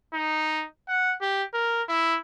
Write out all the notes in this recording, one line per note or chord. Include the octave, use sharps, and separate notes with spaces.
D#4
F#5
G4
A#4
E4